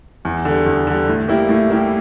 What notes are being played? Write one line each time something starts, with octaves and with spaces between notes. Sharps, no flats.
E2
D3
G3
E2
D3 G3
A2
G3 A#3 E4 G4
A2
G3 A#3 E4 G4